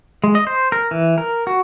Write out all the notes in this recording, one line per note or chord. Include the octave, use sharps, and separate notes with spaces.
G#3
D#5
C5
A#4
E3
A#4
F#4